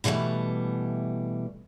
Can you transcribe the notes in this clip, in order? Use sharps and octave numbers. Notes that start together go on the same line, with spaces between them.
B2 D3 E3 G3 A3